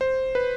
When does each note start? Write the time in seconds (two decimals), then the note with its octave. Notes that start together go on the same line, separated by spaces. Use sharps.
0.01 C5
0.35 B4